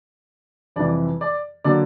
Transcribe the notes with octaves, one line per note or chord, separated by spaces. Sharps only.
F2 C3 E3 G3 D5
D5
D3 F#3 A#3 D5